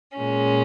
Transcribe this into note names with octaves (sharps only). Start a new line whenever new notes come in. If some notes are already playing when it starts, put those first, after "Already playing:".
A#2 G#3 C#4